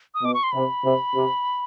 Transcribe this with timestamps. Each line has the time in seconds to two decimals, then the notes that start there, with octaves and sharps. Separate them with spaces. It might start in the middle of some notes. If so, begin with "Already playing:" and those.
0.15 D#6
0.22 B2 D6
0.34 C#6
0.43 C6
0.52 C3 B5
0.83 C3
1.15 C3